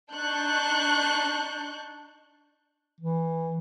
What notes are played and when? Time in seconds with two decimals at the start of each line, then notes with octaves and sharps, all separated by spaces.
0.12 D4 D#4 A5 C#6 F#6 G6
3.01 E3